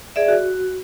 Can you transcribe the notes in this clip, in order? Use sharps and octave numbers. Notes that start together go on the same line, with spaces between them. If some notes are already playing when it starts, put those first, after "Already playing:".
G#4 D5 E5
F#4